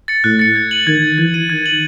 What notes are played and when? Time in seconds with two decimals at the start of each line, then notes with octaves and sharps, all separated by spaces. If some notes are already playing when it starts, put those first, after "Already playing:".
0.08 A6 C#7
0.24 A2 F#6
0.39 A6 C#7
0.55 G#6
0.71 D#7 F#7
0.87 D#3 G#6
1.02 D#7 F#7
1.18 E3 G#6
1.34 D#7 F#7
1.49 D#3 G#6
1.66 D#7 F#7